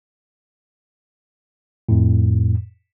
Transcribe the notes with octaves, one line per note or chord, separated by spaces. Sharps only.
F2 A2